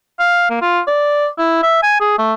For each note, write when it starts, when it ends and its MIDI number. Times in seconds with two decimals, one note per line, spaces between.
0.19 0.49 77
0.50 0.59 58
0.61 0.80 65
0.87 1.28 74
1.38 1.60 64
1.63 1.81 76
1.83 1.96 80
2.00 2.15 68
2.19 2.34 57